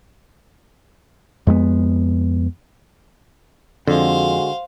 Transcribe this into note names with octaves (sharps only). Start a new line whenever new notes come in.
F2 G#3 A3 B3
F2 D3 G#3 F#4 C5 F5